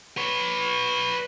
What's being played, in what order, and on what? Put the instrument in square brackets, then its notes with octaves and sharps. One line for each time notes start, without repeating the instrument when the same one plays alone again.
[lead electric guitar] B4 C#5